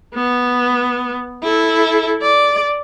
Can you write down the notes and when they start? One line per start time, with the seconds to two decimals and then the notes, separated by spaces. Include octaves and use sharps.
0.15 B3
1.43 E4 A4
2.22 D5